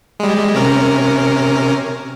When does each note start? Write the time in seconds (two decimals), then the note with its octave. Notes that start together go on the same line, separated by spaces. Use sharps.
0.20 G3 G#3
0.55 C3 C#4 A#4